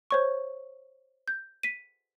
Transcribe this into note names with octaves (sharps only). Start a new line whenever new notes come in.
C5 C#5 C#6
G6
B6 D#7